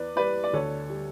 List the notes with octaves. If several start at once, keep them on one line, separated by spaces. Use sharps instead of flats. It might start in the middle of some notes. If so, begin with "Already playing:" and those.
Already playing: E2 B4 D5
G3 B4 D5
D5
D2 A4 C#5
G3